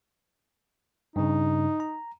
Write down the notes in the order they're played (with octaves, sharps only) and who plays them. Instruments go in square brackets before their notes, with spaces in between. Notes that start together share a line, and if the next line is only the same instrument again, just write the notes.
[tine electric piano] G2 C#3 [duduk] D#4
[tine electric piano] A#5